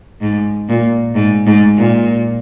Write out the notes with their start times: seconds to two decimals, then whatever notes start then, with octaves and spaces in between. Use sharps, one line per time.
0.21 G#2
0.69 A#2
1.15 G#2
1.46 G#2
1.77 A#2